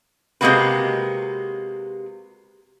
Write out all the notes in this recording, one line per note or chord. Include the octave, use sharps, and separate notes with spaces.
C3 F#3 G#3 A#3 F#4 B4